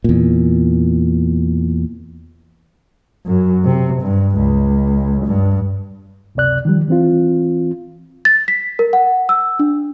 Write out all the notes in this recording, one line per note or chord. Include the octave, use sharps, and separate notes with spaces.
E2 A#2
F#2
C3
G2
C#2
G2
C#2 F#2 C3 D5 F#6
D#3 F3 G3
E3 C4 F4
A6
B6
A#4
F#5
E6
D4